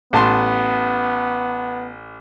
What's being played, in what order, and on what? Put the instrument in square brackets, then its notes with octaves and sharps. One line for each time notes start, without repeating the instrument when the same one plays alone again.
[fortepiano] A1 A5 C6 [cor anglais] B3